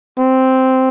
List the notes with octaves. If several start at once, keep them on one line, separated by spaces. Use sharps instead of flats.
C4